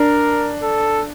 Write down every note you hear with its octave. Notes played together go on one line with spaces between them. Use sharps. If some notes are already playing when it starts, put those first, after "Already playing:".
Already playing: D4 A#4
A4